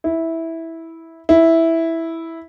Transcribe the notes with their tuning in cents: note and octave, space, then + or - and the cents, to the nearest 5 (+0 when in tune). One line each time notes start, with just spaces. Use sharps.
E4 -10
E4 -5